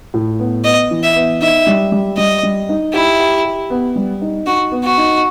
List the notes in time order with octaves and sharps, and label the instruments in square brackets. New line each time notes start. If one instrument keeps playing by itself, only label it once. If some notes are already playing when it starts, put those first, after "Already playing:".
[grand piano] A2
B3
[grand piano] B3 [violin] D#5
[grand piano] E3
[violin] E5
[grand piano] B3
[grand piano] D#4 [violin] E5
[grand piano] G3
G3
[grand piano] G3 [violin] D#5
[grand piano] G3
D#4
[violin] E4 [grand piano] G4
[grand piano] G4
G4
B3
G3
D#4
[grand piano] D#4 [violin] F#4
[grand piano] B3
[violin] F#4
[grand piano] D#4